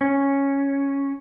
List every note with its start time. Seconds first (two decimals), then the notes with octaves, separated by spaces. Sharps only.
0.01 C#4